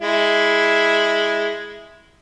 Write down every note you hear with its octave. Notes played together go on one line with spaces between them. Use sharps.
G#3 E4